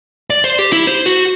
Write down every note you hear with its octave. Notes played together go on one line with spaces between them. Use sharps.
D5
C5
G4
E4
C5
F#4